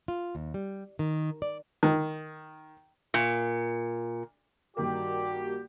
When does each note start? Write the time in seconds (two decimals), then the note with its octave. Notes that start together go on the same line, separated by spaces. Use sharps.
0.08 F4
0.35 D#2
0.54 G3
0.99 D#3
1.42 D5
1.83 D#3
3.14 A#2
4.77 G2 D#3 A#3 F#4 G4 D5